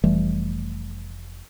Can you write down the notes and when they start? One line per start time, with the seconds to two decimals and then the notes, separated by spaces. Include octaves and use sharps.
0.04 F1 E3 G3 A3